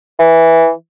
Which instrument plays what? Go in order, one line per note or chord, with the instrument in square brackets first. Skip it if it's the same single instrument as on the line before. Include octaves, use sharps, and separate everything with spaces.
[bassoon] E3